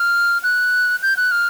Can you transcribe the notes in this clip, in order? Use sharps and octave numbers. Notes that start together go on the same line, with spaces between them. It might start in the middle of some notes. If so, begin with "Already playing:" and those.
Already playing: F6
F#6
G6
F#6
F6